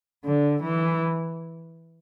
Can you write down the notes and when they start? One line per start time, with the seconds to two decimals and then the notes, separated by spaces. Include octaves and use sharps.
0.25 D3
0.63 E3